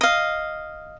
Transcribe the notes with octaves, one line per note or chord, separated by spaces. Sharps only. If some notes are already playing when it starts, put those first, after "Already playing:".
D#5 F5